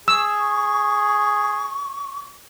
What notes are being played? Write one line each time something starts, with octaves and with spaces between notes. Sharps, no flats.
G#4 C#6 E6